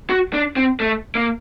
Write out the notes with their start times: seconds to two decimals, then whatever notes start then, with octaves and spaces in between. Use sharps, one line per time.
0.10 F#4
0.33 D4
0.56 C4
0.80 A3
1.15 A#3